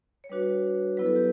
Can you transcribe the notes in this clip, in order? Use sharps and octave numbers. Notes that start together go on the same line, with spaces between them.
C#5
G3 D4 F#4 B4
F#3 B3 E4 B4
A4
G4